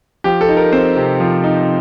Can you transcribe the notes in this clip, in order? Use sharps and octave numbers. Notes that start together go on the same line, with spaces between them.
F3 G4
A4
D#4
A#4
C4 C5
C3
F3
D#4